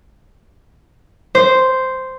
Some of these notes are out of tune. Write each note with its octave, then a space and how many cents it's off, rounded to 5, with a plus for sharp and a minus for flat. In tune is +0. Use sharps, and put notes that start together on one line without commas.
C5 -5